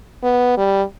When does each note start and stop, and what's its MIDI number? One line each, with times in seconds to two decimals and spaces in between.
0.23 0.54 59
0.57 0.82 55